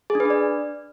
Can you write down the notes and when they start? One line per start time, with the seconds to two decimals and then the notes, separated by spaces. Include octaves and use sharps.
0.10 G#4
0.15 D4
0.20 B4
0.25 D4
0.30 D5